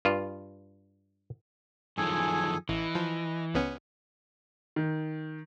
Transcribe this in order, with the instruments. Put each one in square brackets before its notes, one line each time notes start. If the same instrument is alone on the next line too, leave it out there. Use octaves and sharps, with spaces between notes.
[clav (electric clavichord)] G2 F4
[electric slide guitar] F#2 D#3 F3 [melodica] G#4 A4 G#5
[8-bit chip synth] A1 [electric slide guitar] E3 [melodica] D#5
[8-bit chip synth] F3
C#2 B3 C#4
[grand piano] D#3